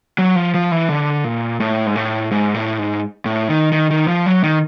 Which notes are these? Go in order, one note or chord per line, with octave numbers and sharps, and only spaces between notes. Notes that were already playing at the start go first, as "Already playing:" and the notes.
F#3
F3
F3
E3
D3
A#2
A2
G#2
A2
G#2
A2
G#2
A2
D#3
D#3
D#3
F3
F#3
D#3